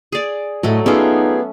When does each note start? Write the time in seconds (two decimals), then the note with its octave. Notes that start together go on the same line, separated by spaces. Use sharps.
0.12 G#4 D5
0.63 A2 F#3 A3 D#5
0.86 B3 C#4 D#4 F4 G#4 D5 E5